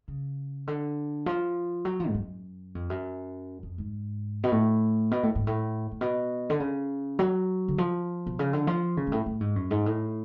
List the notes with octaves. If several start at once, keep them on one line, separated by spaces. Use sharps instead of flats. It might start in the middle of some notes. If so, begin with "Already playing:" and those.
C#3
D3
F3
F#3
F3
G#2
F#2
F2
F#2
F2
G#2
B2
A2
B2
A2
G#2
A2
A2
B2
D3
C#3
F#3
D3
F3
B2
C#3
D3
F3
C#3
G#2
A2
A2
G#2
F#2
G#2
A2